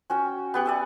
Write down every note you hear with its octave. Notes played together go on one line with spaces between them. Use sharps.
C#4 F#4 G5
B3 G4 F#5
D5 E5 G#5